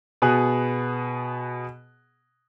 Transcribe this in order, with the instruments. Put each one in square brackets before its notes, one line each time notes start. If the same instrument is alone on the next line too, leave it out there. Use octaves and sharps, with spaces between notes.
[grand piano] B2 B3 G#4 F#6